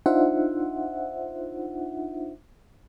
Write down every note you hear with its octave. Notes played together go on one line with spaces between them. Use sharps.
D4 D#4 F4 C5 E5 F#5